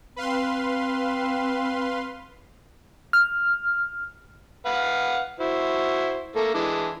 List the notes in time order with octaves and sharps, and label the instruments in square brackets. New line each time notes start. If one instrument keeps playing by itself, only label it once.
[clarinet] C4 [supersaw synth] B4 F5 C6
[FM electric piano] F6
[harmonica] B4 F5 F#5
E4 F#4 C5
A3 A#3 A4
E3 G#3 D4